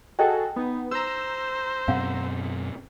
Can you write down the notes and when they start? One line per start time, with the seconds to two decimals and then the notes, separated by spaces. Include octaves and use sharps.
0.19 F#4 G#4 A4 D#5 G5
0.56 B3 D#4
0.91 C5 A#5 E6
1.88 F#2 B2 C4 F5 F#5